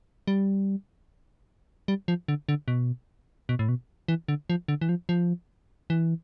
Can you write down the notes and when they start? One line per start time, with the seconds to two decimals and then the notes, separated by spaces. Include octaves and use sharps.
0.27 G3
1.88 G3
2.08 F3
2.28 D3
2.49 D3
2.68 B2
3.49 B2
3.59 A2
3.69 B2
4.08 E3
4.28 D3
4.50 F3
4.68 D3
4.81 E3
4.89 F3
5.09 F3
5.90 E3